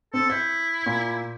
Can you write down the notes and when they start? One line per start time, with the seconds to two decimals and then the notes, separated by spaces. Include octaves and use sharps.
0.14 C4 A4
0.30 E4 G6
0.86 A#2